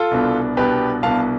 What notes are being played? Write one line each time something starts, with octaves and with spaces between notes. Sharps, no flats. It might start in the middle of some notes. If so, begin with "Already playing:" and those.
Already playing: F4 A4
C2 B2 B3 D4
C2 B2 B3 D4 G4 B4
C2 B2 B3 D4 F5 A5